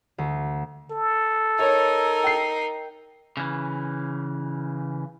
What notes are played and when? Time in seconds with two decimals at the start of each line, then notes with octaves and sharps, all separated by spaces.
0.18 D2
0.91 A4
1.59 D#4 A#4 C#5
2.24 G5 C7
3.37 C#3 E3